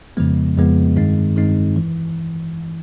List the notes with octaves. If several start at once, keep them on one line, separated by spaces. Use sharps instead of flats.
F2 C#3 F3 G#3 B3
F2 C#3 F3 G#3 B3
G2 D#3 G#3 C4 D#4
G2 D#3 G#3 C4 D#4
E3